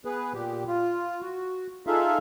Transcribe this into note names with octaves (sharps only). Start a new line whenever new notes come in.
B3 G#4 B4
A#2 G4
F4
F#4
D#4 F4 G#4 A4 E5 F5